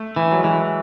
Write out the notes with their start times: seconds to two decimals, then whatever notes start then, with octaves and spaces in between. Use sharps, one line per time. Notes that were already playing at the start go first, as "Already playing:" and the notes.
Already playing: A3
0.16 E3
0.31 F#3
0.38 G#3
0.44 E3 F#3